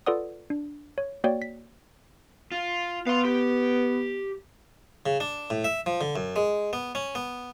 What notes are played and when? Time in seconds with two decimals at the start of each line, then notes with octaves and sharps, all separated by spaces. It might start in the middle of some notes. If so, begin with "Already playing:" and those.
0.06 F4 A4 B4 D5 F#5 D#6
0.50 D4
0.98 C#5
1.24 A#3 F#4 C#5 D5 G5
1.42 B6
2.52 F4
3.07 B3 F5 C6
3.25 G4
5.06 C#3
5.20 D4
5.50 A2
5.64 E5
5.86 F3
6.01 D3
6.16 F#2
6.36 G#3
6.73 B3
6.95 C#4
7.15 B3